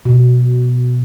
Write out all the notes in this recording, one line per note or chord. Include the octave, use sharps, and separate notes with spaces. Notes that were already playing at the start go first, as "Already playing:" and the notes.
B2